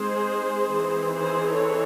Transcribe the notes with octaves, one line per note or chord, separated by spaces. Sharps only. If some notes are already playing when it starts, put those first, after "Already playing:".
Already playing: G#3 C4 D#4 G#4 C5
E3 C4 D#4
G#4 C5
A4 C#5